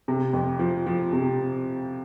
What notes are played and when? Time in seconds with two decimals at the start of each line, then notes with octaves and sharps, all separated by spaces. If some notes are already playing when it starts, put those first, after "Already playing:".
0.08 C3
0.33 F2
0.59 F3
0.86 F3
1.13 C3